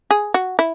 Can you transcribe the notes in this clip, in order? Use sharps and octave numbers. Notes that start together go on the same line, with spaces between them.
G#4
F#4
E4